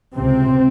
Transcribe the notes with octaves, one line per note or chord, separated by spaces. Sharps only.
C#2 C3 C4